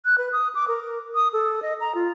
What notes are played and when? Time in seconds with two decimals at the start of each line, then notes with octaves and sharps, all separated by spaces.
0.05 F#6
0.18 B4
0.32 D#6
0.55 D6
0.68 A#4
1.15 D#6
1.33 A4
1.62 D#5
1.80 A#5
1.95 F4